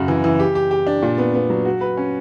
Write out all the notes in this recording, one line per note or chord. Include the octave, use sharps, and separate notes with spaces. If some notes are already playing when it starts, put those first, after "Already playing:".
Already playing: F#2 C#3 F#4
E3
E3
G4
G4
G4
D4
A#2
B3
B3
F#3
F#4
B4
C#4